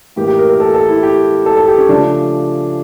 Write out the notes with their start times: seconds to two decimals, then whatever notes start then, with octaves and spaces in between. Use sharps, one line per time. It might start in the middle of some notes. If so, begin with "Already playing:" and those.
0.16 A2 E3 A#3 G4
0.28 G4
0.38 A#4
0.50 A#4
0.60 A4
0.74 A4
0.89 E4
1.03 G4
1.46 A4
1.57 A4
1.68 G4
1.78 C#4
1.89 C#3 F3 A3 D4